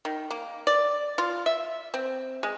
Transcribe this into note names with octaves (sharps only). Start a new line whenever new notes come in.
D#3
A#3
D5
F4
E5
C4
G#3